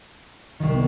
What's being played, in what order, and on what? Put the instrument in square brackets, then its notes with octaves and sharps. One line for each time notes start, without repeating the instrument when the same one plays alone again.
[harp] C2 D#3
[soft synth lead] B3